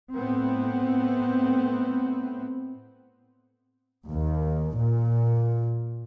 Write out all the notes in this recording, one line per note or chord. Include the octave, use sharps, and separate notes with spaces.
A2 B3 C4
D#2
A#2